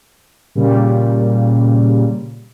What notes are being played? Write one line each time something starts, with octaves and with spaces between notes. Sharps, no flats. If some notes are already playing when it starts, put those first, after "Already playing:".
A#2 C#3 G3